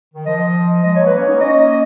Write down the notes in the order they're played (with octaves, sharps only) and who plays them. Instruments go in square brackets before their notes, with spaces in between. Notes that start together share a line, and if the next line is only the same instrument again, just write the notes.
[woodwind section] D#3
[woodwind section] F3 [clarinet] D#5
[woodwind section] F3 G#3 [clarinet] D#5
[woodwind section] F#3 A#3 [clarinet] C#5
[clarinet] B4
[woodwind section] A#3 C#4
[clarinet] C#5
[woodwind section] B3 D#4
[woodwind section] A#3 C#4 [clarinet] D#5